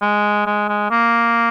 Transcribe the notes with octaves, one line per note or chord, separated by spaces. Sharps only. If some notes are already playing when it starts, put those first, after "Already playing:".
G#3
G#3
G#3
A#3